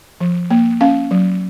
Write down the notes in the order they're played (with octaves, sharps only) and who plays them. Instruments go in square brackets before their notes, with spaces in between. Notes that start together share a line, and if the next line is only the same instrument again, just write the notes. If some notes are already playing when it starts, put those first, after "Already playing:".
[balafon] F3
A#3
C#4 F5
F#3